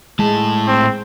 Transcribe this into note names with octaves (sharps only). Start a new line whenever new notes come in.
A2 G#3 A5
C4